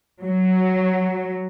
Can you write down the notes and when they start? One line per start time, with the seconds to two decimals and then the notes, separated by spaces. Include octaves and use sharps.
0.23 F#3